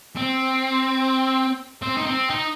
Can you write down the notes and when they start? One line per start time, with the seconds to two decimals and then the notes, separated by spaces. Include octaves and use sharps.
0.17 C4
1.82 C4
1.97 D#4
2.06 C4
2.30 D#4